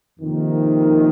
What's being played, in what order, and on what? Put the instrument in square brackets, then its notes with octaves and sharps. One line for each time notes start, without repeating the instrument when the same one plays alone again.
[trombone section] F2 C3 D#3 A#3